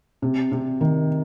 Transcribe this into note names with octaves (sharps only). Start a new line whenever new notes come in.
C3
C3
D#3